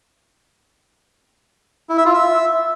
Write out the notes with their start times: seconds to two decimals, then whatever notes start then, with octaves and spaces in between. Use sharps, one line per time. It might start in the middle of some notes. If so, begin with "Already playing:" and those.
1.89 E4
1.97 E5
2.06 F4
2.14 E5